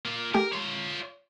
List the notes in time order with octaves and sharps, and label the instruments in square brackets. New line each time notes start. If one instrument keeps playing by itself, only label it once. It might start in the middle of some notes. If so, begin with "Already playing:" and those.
[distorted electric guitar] A#3 F4
[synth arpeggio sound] A3 G4 G#4 [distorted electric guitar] A#4
[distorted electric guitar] F4 C#5 [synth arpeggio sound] C6